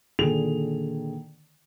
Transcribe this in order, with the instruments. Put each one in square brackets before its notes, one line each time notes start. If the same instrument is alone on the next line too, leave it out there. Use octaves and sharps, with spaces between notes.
[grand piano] A#2 D3 D#3 G#4 F7